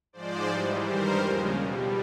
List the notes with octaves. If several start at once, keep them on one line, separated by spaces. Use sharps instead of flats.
G#2 F3 G#3 C5 D5
G#2 E3 G3
G2 D#3 G3 A#4 C5
D#2 C#3 F3 G#3
B2 G3